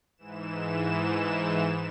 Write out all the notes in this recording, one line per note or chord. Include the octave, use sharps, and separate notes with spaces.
G#2 E3 E7